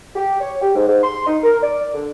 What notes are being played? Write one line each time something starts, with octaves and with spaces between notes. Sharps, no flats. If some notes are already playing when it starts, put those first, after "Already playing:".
G4
C#5
G4
G#2
G#2
C6
D#4
A#4
D5
D3